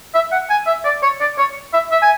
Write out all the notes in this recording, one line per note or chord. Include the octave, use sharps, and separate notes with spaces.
E5
F#5
G#5
E5
D5
C#5
D5
C#5
E5
E5
G#5